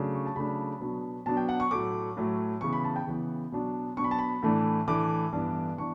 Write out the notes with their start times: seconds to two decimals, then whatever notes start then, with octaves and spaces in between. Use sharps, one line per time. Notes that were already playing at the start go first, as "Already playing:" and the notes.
Already playing: C#3 F#3 A3 D4
0.13 C#6
0.26 A5
0.35 C#3 F#3 A3 D4 B5
0.80 B2 F#3 B3 D4
1.26 B2 F#3 B3 D4 A5
1.37 G5
1.49 F#5
1.60 C#6
1.71 A2 F#3 A3 D6
2.17 A2 F#3 A3
2.61 C#3 E3 B3 C#6
2.73 B5
2.84 A5
2.96 G5
3.07 C#3 E3 B3
3.52 B2 F#3 B3 D4
3.97 B2 F#3 B3 D4 C#6
4.04 B5
4.11 A5
4.18 B5
4.42 A2 E3 A3 D4
4.87 A2 E3 A3 D4 D6
5.32 G2 E3 B3 D4
5.78 E3 B3 D4 C#6